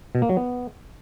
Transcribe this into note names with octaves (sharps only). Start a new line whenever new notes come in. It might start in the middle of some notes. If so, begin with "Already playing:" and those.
B2
A#3
F#3
B3